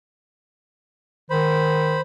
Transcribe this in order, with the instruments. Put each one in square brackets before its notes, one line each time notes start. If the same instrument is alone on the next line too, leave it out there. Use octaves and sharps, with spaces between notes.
[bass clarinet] D#3 [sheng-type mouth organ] C5 B5